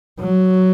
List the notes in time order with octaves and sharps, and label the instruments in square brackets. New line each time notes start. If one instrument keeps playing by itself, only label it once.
[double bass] F#3